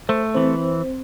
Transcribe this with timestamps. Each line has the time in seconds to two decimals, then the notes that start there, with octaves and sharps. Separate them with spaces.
0.09 A3 C5
0.35 E3 C4 C5